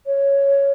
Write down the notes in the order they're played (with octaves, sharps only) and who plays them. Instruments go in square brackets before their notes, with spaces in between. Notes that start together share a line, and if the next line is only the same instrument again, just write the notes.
[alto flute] C#5